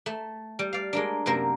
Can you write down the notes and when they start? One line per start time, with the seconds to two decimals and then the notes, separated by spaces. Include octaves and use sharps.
0.06 A3
0.59 G3
0.73 D5 F5
0.93 G#3 A#3 D4
1.26 F#2 C3 A#3 A#4